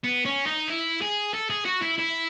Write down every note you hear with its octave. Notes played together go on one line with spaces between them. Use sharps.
B3
C#4
D#4
E4
G#4
A4
G#4
F#4
E4
E4